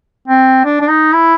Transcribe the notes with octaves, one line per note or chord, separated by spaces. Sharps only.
C4
D4
D4
D#4
E4